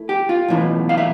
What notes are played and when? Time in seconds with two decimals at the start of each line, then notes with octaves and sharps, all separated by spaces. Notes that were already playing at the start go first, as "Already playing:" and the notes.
Already playing: A3 E4
0.09 G4
0.29 F4
0.48 B1 A2 E3
0.89 F5
0.98 E5